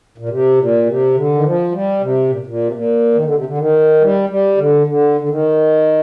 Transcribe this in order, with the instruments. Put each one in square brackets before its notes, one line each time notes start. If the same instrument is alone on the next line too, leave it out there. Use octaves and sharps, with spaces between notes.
[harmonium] A#2
C3
A#2
C3
D3
D#3
F3
G3
C3
A#2
A#2
C3
A#2
D#3
D3
C3
D3
D#3
G3
G3
D3
D3
D3
D#3